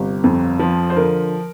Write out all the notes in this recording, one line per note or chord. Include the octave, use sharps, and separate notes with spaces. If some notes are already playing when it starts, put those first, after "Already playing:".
Already playing: G1 C3 G4
F2
F3
C5
D3 A#4